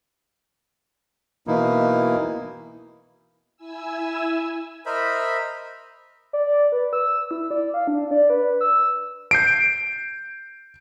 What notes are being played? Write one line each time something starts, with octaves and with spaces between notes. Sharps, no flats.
B2 E3 A#3 D#4 E4
E4 G#5 E6
A#4 C5 D#5 E5 B5
D5
B4
E6
E4
D5
F5
D4
D5
B4
E6
G6 C7 D7